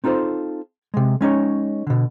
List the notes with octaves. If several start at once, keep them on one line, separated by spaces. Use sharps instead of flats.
C4 D#4 F4 A4 C5
C3 G#3
G#3 C#4 D#4 C#5
B2 D3